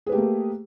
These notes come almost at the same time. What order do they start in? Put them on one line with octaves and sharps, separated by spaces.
G#4 B4 G4 A3 A#3